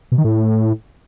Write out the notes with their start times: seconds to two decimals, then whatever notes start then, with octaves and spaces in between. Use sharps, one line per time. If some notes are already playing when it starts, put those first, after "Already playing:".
0.12 B2
0.18 D#3
0.24 A2